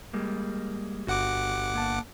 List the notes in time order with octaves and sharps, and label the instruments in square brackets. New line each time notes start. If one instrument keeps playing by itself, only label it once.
[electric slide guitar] G3 G#3 A#3
[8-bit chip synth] G1 F#5 D6 [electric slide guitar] F#4 G4
[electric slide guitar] A#3 A5